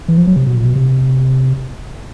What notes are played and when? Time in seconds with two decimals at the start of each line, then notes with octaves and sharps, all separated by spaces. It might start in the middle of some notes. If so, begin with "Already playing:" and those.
0.08 E3
0.17 F3
0.27 F#3
0.36 C3
0.46 B2
0.56 A#2
0.65 B2
0.75 C3